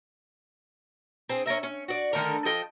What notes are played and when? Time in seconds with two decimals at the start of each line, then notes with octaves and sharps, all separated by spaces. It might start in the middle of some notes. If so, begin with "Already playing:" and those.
1.29 C4 G#4
1.46 C#4 D#4 A#4 E5
1.63 C#4
1.88 F#4 D5
2.13 D3 D#3 A3 A#4
2.45 F3 A4 D#5 G5